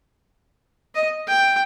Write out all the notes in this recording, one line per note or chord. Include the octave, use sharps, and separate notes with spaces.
D#5
G5